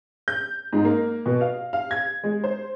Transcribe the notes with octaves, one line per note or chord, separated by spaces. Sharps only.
G6
G#2
A#3
B2
F5
F5
G#6
G#3
C5